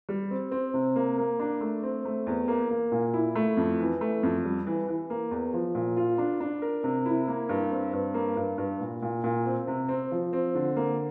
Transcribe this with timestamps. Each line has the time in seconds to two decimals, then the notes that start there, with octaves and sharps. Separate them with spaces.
0.09 G3
0.31 C4
0.52 C4
0.74 C3
0.96 A#3
1.18 A#3
1.40 D4
1.61 A3
1.83 C4
2.05 A3
2.27 E2
2.48 A#3
2.70 A#3
2.92 A#2
3.14 E4
3.35 A3
3.57 F2
3.80 E3
4.01 A3
4.23 F2
4.44 G3
4.67 E3
4.88 E3
5.10 A#3
5.31 E2
5.53 F3
5.75 A#2
5.97 F4
6.18 D4
6.40 D4
6.62 A#4
6.84 C3
7.06 E4
7.28 A#3
7.49 G2
7.71 C4
7.93 G2
8.14 A#3
8.37 G2
8.58 G2
8.80 A#2
9.02 A#2
9.24 A#2
9.46 C4
9.67 C3
9.88 C4
10.11 F3
10.33 C4
10.55 D3
10.76 A#3